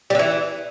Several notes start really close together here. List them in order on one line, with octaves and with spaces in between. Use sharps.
G3 D3 E3